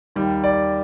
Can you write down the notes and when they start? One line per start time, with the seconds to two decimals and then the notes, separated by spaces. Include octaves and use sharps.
0.16 D#2 D#3 G3
0.44 D5